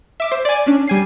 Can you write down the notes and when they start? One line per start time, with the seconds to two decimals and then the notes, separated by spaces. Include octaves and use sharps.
0.20 E5 D6 E6
0.31 C5
0.45 D5 G#5
0.66 C#4 D4
0.87 G3 G#5 C7